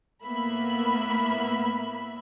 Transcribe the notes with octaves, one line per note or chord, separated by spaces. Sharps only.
A2 A#3 B3 E5 B5